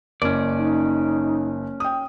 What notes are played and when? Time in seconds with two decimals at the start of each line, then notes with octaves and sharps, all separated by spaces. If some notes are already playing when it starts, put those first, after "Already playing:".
0.22 F#1 C#4 D5
0.53 D#4
1.80 G5 D#6